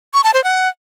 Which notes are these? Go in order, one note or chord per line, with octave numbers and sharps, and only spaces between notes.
C#6
A5
C5
F#5